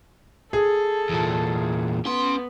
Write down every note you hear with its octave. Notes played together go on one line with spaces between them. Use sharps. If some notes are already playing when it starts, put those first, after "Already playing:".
G#4 A4
E2 A#2
B3 C#4 C6